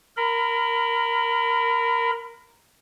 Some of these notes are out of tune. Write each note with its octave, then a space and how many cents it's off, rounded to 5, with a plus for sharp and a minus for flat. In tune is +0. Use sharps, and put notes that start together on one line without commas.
A#4 +0 B5 +25